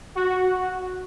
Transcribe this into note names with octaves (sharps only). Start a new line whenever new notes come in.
F#4